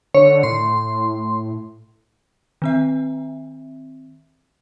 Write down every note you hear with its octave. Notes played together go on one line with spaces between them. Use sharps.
D3 C#5
A2 C6
D#3 C4 E5